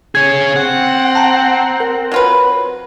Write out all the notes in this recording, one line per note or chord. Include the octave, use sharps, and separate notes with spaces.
G#4 C#5 G#6
C4 F#5
A5 A#5
A#4
F#3 F4 B4